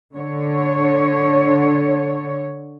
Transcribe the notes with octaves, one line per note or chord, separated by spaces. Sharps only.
D3 C#5